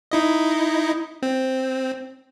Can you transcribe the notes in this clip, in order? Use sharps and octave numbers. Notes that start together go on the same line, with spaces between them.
D#4 E4 D#5
C4